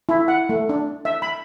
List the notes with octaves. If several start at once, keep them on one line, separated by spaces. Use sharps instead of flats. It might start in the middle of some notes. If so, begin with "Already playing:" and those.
E4
F#5
A3
D4
E5
B5